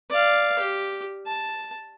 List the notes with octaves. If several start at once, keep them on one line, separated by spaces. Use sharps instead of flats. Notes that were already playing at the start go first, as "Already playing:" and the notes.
D5 F5
G4
A5